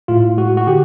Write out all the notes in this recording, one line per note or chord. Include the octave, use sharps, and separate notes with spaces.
A2 F4
G#3 F#4
F#4
D3 G4